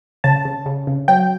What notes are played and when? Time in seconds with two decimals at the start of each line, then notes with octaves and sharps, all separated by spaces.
0.24 C#3 A5
0.45 C#3
0.66 C#3
0.87 C#3
1.08 F#3 G5